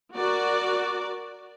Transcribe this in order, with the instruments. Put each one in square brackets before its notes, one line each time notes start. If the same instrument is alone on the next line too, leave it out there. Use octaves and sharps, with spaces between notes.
[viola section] F#4 A#4 D5